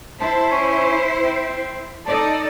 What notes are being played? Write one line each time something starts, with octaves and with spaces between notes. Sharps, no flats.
E4 C5 A5
C#4
C4
D#4 A4 D5 A5